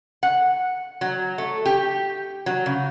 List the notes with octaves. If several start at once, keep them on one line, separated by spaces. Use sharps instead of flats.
F#5
F#3
A3
G4
F#3
C#3